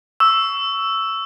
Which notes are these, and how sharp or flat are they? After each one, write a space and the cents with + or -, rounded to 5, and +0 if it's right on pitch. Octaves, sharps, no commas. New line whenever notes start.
C#6 +20 E6 +0